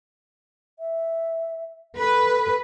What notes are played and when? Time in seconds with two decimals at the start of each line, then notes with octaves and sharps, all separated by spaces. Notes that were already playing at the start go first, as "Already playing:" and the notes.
0.79 E5
1.97 A4 B4